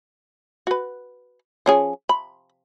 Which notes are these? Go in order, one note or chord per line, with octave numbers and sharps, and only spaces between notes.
F#4 B4
F3 C#4 G#4
B5